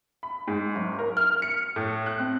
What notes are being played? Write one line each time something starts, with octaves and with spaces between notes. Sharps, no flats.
B5
G#2
F#1
A#4
F6
C#7
A2
F#6
C4